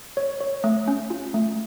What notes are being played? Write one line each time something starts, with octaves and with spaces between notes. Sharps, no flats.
C#5
C#5
A3
C#4
F4
A3